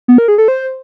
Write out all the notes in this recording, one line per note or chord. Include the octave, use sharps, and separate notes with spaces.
B3
A#4
G#4
A4
C5